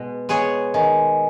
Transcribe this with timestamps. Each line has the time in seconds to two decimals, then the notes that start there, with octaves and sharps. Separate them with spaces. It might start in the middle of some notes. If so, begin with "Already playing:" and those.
Already playing: B2 G#3 B3
0.29 G#3 B3 G#4 C#5
0.74 D#3 D#5 G#5